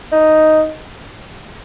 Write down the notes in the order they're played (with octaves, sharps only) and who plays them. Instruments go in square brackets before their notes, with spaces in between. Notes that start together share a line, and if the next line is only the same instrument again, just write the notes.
[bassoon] D#4